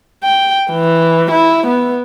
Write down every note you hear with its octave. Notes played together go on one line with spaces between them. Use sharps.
G5
E3
E4
B3